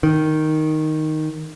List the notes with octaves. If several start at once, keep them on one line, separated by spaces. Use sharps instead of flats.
D#3